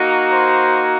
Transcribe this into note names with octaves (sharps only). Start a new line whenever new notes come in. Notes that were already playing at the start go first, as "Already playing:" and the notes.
Already playing: A#3 D#4 F#4
C5